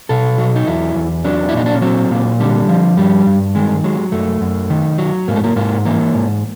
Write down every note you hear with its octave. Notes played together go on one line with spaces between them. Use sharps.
B2 A4
F#3
D#4
E2 E4
E2
F#3 D4
E4
A#2 D#4
D4
C#4
F#3 C4
A#2
D3 G3
F3
G2 G3
G2
D#3 G#3
F#3 G#3
F#2 A3
F#2
D#3
F#3
G#2 A#3
A3
A#3
G#2 A#3
E3 A#3
G#2